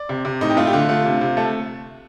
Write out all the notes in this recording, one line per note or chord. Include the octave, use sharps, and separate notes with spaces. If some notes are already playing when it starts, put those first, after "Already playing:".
Already playing: D5
C3
C3
A2 D#4
G4
A3 F4
G4
D3 F4
A3 F4
C3
C3
A3 A4